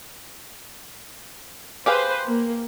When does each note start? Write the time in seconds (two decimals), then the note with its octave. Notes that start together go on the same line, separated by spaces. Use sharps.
1.86 G4 G#4 B4 C5 F5
2.27 A#3